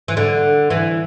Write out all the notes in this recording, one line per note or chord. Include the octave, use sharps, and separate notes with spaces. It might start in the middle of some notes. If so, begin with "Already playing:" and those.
E3
D3
E3